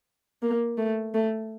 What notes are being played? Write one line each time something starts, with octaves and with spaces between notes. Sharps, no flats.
A#3
A3
A3